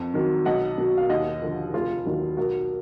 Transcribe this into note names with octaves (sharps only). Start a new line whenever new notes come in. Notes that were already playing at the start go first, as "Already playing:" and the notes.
Already playing: F2
D#3 F#3
B1 D#5 F#5
B2 F#3
F5
D#2 D#5 F#5
D3 F3
F1 F4 G#4
D#2 D#3 F#3
B1 F#4 A#4